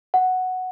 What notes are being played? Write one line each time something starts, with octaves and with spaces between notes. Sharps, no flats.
F#5